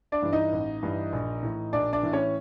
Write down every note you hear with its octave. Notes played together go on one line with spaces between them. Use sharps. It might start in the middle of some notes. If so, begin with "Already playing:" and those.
D4 D5
G2 E3
D#4 D#5
A1
G2 E3
A#1
A2 E3
A#1 D4 D5
D4 D5
A2 E3
C#4 C#5